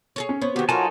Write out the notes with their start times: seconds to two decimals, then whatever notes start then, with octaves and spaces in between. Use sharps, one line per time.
0.16 G#4 A4 C#5
0.29 C#4
0.41 B3 C5 C#5
0.56 D#3 B3 F#4 G4
0.69 F#3 D#4 F4 F#4 A4 A#4 G#5 A5